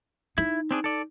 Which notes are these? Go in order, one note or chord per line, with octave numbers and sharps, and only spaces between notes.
D#4 E4
C4 D4 G#4
A4 D5